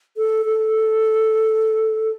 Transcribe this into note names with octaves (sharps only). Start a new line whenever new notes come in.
A4
A4